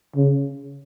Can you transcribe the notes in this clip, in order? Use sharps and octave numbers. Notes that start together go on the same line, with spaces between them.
C#3